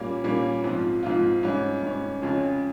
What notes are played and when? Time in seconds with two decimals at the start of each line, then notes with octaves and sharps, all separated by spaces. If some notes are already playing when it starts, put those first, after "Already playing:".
Already playing: A#2 G3 A#3 C#4
0.24 A#2 G3 A#3 C#4
0.63 G#2 F3 C4 F4
1.03 G#2 F3 C4 F4
1.43 G#2 G3 C#4
1.83 G#2 G3 C#4
2.22 F2 C#3 G#3 C#4